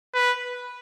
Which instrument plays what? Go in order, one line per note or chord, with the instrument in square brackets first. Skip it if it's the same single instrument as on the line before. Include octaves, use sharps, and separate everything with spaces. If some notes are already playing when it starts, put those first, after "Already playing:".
[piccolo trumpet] B4